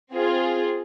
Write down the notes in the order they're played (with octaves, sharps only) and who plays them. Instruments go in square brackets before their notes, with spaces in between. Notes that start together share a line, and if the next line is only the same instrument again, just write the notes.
[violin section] C4 F4 G#4